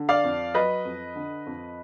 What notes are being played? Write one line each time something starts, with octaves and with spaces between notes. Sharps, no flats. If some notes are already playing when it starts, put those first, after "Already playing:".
Already playing: D3
D5 F5
F2
F#3 B4 D#5
F2
D3
F2